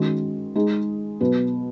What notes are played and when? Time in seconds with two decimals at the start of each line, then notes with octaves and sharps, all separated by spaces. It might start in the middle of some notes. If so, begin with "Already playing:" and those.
Already playing: D#3 G#3 C#4 F#4
0.55 G#3 D#4 G#4
1.20 B2 F#3 B3